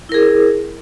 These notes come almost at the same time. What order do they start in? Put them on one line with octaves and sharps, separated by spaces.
E4 A#4 G#4